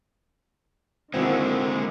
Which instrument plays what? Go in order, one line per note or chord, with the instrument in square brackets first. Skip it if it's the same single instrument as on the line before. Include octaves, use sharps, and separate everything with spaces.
[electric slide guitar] D3 G#3 [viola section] D#3 A#3 [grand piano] C4 E4 F#4